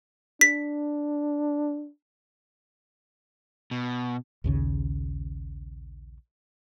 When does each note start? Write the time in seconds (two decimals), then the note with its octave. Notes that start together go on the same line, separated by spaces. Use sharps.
0.41 D4 B6
3.71 B2
4.44 A#1 D#2 C#3